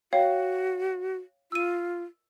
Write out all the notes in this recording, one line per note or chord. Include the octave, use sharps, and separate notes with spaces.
F#4 C#5 F5 G5
F4 E6 D#7